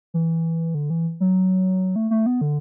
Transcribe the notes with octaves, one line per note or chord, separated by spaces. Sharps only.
E3
D3
E3
F#3
A3
A3
B3
D3